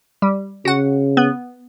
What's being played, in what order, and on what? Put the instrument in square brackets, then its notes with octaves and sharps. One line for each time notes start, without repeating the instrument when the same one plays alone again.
[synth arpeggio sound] G3
[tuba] C#3 [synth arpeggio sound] F#4 F#5
[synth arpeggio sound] B3